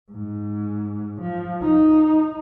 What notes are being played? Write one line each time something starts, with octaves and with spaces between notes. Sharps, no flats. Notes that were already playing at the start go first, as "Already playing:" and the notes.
G#2
F3
D#4